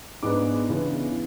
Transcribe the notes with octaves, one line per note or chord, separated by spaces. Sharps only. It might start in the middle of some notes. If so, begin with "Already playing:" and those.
G#2 G#3 B3 D4 D6
C#3 E3 B3 D4